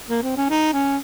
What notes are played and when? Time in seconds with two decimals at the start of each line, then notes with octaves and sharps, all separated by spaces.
0.09 A#3
0.23 C4
0.37 C#4
0.50 D#4
0.73 C#4